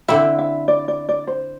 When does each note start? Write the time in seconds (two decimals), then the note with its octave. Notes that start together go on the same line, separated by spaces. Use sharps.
0.08 D3 C4 E4 E5
0.39 E5
0.68 D5
0.88 D5
1.09 D5
1.27 C5